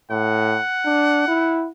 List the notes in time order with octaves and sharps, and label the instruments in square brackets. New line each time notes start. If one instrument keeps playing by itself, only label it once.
[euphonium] A2 [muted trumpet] F#5
[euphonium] D4
E4